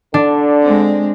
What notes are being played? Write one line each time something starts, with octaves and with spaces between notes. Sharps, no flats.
D3 D4
G#3 C4